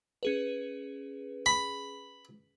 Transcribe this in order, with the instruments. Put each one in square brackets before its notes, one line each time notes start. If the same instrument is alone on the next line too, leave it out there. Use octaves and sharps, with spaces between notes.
[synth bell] C#4 G#4 B4
[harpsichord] B5